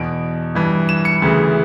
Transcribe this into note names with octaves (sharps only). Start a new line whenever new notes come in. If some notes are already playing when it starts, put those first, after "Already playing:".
Already playing: E2 B2 D7
G2 E3
E7
C#7
D2 C#3 E3